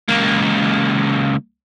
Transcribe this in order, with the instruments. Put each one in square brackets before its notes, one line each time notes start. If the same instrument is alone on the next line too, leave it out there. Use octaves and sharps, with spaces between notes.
[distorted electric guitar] C#2 A#3